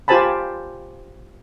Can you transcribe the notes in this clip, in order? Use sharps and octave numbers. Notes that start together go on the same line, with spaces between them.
F4 G4 C5 G#5 A5 B5